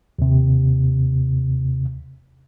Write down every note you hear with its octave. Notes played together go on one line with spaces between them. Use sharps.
D#2 C3